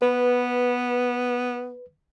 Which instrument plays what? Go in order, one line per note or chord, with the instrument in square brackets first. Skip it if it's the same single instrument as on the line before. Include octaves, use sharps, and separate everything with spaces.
[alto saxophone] B3 [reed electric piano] B4